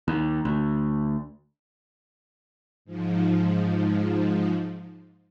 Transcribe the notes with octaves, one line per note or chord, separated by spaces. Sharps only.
D#2
D2
G#2 F3